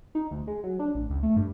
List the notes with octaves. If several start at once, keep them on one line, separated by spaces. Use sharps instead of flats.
D#4
D2
G#3
F#3
D4
A1
C#2
A3
G2